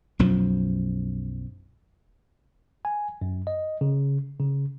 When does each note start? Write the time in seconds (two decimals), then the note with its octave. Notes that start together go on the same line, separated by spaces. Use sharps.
0.19 B1 F#2 F3
2.85 G#5
3.21 F#2
3.47 D#5
3.81 C#3
4.40 C#3